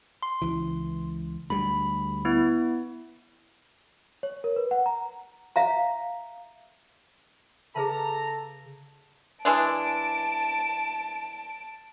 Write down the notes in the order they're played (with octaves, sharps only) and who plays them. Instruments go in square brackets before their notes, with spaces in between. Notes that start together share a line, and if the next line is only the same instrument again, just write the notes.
[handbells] C6
[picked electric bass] C#2 E3
[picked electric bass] D2 G3 [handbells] B5
[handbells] B3 E4
[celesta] C#5
A#4
B4
F#5
A#5
[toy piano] E5 F5 A#5
[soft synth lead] C#3 [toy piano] G#4 B4 A5 [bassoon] A4 [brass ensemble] A#5
[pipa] E3 G#3 D4 [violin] A5 D7